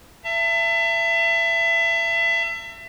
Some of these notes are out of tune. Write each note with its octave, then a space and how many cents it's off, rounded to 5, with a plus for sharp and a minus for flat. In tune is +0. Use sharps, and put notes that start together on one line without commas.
E5 +25 A5 +45